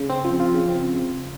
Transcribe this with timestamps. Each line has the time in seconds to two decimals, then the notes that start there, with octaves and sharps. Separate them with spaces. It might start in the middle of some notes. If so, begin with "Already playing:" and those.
Already playing: C#3
0.10 C4
0.24 F3
0.40 F4
0.54 C#3
0.69 C4